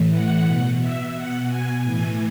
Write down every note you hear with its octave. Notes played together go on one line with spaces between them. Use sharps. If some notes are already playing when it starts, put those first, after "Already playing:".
Already playing: A2 E3
F#5
B2
E5
B2 F#5
G#5
A2 E3 G#5